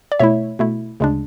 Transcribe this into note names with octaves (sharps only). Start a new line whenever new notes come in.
D5
B2 A3 E4 C#5 E5
B2 A3 E4
D2 C#3 G#3 D4